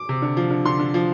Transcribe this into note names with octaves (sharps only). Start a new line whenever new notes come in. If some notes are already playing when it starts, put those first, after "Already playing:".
Already playing: D6
C3
D3
F3
D3
D3 C6
D3
F3